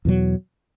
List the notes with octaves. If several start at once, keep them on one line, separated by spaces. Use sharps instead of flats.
E2 B2 F#3